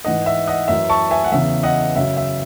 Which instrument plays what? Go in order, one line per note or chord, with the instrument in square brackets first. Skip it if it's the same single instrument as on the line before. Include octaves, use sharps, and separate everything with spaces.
[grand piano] G#2 E3 D#5 F#5
E5
D#5 F#5
F#2 E3 E5
A5 C#6
E5 G#5
F#5
E2 C#3 E3 E5
D#5 F#5
F#2 C#3 F#3 E5
E5